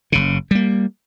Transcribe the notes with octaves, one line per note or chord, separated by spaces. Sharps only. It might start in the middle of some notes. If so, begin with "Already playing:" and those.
F#1 C#3
G3 A#3